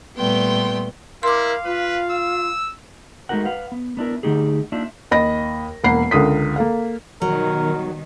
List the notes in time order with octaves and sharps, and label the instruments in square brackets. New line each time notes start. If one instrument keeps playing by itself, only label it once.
[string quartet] A#2 G3 A3 B3 G5 C6
[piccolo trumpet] E4 [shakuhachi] A#4 [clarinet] F5 [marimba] C6 D6
[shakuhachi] F4 [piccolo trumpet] B4
[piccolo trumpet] E6
[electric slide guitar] G#3 A3 D#4 F#4 A#4 F#5
B4 F5 F#5
B3
B3 D4 E4 A#4
D3 A3 D#4 G4 G#4
A#3 D4 D#4 F4 E5
[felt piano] D#2 D#5 B5 A#6
E1 A#3 F#5 B5 C7
C#2 D3 A#4 D#6 B6
A#3 A4 F5
[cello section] B2 D#3 G3 [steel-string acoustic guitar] F#3 [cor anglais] A#4